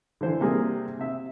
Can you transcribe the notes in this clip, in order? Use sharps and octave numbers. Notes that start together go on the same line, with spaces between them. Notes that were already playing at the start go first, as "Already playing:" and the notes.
D3 E3 C5
C3 G3 A#3 G4 G#4
C3 E5